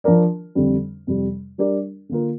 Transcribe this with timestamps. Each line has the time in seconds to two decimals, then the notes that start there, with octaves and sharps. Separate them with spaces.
0.04 F3 D4 A#4 D5
0.55 F2 D3 G3
1.07 F2 C3 G3
1.58 G3 D4 G4 A#4 D5
2.09 D3 A#3 F4 A#4